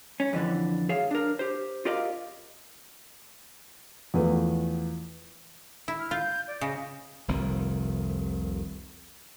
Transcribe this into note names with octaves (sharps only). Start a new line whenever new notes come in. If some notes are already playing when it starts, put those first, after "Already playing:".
C#4
F2 D3 E3 D4
G#4 C#5 E5 F5
D4 A#4
G4 C5
F4 G4 A#4 D5 D#5 F5
E2 F3 A3 B3
E4
F6
F4 G6
D5
C#3 D#5
F1 C2 D#3 C4